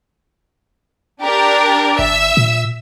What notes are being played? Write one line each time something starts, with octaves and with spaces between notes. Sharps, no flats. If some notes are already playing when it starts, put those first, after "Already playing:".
D4 G4 A#4
G1 E5 E6
A#2